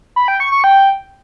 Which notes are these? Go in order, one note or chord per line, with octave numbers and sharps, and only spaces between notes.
B5
G5
C#6
C#6
G5